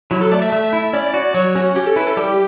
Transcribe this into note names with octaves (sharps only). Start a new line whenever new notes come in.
F#3 E4
A4
A3 D5
E5
A3
E4
C#4 D5
F#4
F#3 C#5
C#4 F#4
C#4 G4
A4
E4 B4
A4
G3 G4